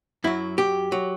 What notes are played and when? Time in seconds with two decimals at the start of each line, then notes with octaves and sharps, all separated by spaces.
0.24 F#2 F#3 E4
0.58 G4
0.92 F#3